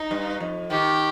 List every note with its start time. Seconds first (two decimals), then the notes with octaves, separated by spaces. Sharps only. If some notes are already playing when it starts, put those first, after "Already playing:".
Already playing: D#4
0.11 G2
0.40 F2
0.70 D#3 G4